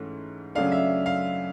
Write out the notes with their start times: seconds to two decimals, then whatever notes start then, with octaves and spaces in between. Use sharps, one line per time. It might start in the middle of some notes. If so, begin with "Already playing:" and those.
Already playing: G#2 E3 A3 C#4
0.55 F#2 C#3 F#3 A3 D4 F5
0.72 E5
1.06 F5